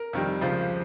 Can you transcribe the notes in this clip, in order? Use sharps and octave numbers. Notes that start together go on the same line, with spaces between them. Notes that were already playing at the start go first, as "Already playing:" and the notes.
Already playing: A#4
F2 D#3 G3
C#2 C#3 F3 C5